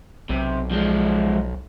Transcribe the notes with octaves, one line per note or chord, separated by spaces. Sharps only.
B1 C3
F3 G#3